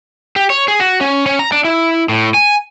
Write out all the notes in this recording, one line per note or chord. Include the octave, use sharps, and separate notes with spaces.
G4
C#5
G#4
F#4
C#4
C#4
A#5
D4
E4
A2
G#5